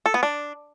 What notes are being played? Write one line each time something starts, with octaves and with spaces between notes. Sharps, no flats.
A4
B3
D4